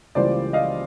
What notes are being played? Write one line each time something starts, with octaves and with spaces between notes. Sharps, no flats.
C#2 C#3 E3 G3 A#3 C5 D5
D#5 F5